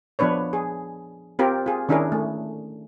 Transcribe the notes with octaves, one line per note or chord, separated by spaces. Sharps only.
F3 B3 D4 B4 C#5
G#4
C4 F4 G4 A#4
F4 G#4
D#3 C#4 D4 E4 G#4 A#4
A3